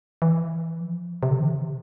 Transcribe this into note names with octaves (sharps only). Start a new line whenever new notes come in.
E3
F3
C3
D3
E3
C3